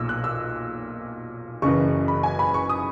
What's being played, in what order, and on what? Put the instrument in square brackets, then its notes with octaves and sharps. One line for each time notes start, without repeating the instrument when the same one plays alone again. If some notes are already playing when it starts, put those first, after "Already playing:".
Already playing: [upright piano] B1 A#2 E6
F#6
E6
F#1 F#2 C#3 E3 C#6
B5
G#5
B5
C#6
D#6